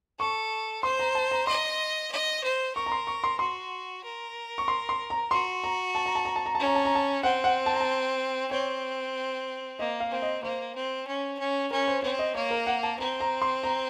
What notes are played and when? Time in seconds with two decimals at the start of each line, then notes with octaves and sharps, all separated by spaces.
0.19 A4 C#6
0.83 C5 C6
0.99 A#5
1.15 A5
1.31 A#5
1.47 D#5 C6
2.11 D#5
2.44 C5
2.75 A#4 C#6
2.86 A#5
2.92 C6
3.07 C#6
3.24 C6
3.39 F#4 C6
4.04 A#4
4.58 C#6
4.68 C6
4.89 C6
5.10 A#5
5.31 F#4 C6
5.64 A#5
5.95 A5
6.06 A#5
6.15 A5
6.25 A#5
6.36 A5
6.46 A#5
6.55 C#4 A5
6.66 A#5
6.75 A5
6.85 A#5
6.95 A5
7.23 C4 F#5
7.44 F#5
7.66 A5
7.73 A#5
7.80 A5
8.51 C4 C#5
9.79 A#3 D#5
10.00 F5
10.11 C4
10.22 D#5
10.43 A#3 C5
10.75 C4
11.07 C#4
11.39 C#4
11.71 C#4 A#4
11.88 C5
12.03 C4 C#5
12.19 D#5
12.35 A#3 C#5
12.51 A#4
12.67 F#5
12.83 A5
12.99 C4 A#5
13.20 A#5
13.42 C6
13.63 A#5